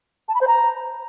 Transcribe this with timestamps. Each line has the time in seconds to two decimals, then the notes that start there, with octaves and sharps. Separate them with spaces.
0.28 A5
0.35 B5
0.41 C5
0.47 A#5